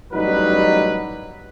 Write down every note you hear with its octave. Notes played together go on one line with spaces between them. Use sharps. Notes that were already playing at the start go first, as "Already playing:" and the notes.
A1 F#2 F#3 G3 D#4 B4